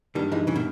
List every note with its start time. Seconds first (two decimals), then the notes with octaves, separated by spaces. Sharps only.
0.15 G2 D#3 G3
0.32 E3 G#3 D#4
0.47 C#3 E3
0.56 B2 D#3